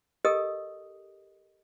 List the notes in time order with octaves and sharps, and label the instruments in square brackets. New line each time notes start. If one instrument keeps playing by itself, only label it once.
[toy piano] G4 A4 A#4 D#5 D#6